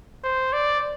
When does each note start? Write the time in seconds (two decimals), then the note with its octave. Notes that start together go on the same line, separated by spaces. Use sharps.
0.24 C5
0.53 D5